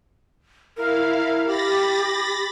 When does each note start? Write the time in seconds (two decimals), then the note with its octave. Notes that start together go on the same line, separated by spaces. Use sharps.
0.77 E4 A#4 F5
1.47 G4 B5 A6 A#6